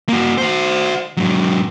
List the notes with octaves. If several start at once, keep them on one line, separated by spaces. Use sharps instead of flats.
A#3 F#4
F#4 C5
G#2 F#3